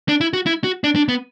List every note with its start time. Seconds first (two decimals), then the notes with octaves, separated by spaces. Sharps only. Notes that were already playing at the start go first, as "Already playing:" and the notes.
0.09 D4
0.21 E4
0.33 F#4
0.46 E4
0.64 F#4
0.84 D4
0.96 D4
1.08 B3